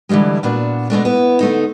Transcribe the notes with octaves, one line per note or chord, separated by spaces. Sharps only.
D3 E3 F3 G3 G#3
A#2 B3 D4 F#4
B2 G#3 A3 D4
B3 E4
D3 A3 D#4